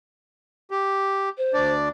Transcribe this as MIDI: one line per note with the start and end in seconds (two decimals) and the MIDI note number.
0.71 1.29 67
1.37 1.72 72
1.54 1.89 38
1.54 1.89 62
1.54 1.89 74